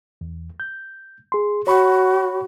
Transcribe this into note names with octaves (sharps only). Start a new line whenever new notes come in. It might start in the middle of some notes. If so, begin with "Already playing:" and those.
E2
G6
G#4 C6
F#4 C#5 B5 C#6